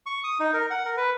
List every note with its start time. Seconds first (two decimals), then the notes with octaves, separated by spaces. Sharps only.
0.06 C#6
0.24 D#6
0.40 D#4
0.53 A#4
0.71 F#5
0.85 A#4
0.97 B4